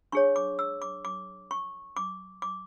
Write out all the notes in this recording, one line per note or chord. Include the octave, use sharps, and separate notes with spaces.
D4 G#4 C#5 C#6
D6
E6
D6
D6
C#6
D6
D6